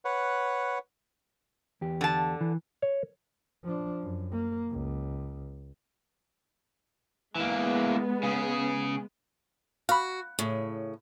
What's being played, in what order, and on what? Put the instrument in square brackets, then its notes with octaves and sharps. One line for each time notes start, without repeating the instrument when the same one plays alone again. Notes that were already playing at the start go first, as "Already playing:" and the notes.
[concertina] B4 C#5 F#5
[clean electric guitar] E2 G4
[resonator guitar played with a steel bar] D3 A5
[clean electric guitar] E3
[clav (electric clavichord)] C#5
[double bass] F3 D4
F#2
A#3
C#2
[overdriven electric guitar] E3 A#3 [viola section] G#3 B3
[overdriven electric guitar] C#3 G#4
[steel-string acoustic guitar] F#4 [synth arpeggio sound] F5 B5
[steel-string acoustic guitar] A2 C#3